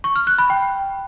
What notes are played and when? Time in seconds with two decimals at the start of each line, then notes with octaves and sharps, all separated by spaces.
0.04 C#6
0.16 F6
0.27 F#6
0.38 B5
0.50 G5